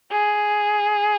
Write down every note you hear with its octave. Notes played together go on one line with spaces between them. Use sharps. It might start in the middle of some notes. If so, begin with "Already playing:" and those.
G#4